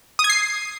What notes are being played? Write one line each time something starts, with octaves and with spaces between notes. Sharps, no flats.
D#6
G#6
C7